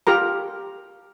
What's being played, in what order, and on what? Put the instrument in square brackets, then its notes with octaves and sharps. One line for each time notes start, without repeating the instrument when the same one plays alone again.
[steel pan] F4 G4 A#4 A#5